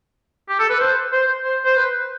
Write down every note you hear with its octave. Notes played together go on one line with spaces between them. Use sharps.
G4
A4
B4
C5
C5
C5
C5
B4